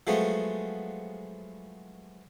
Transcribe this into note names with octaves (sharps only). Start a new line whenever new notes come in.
F3 F#3 G#3 A3 B3